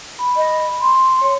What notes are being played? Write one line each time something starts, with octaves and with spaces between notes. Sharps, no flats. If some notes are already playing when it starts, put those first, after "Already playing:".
B5
D#5
C6
C#5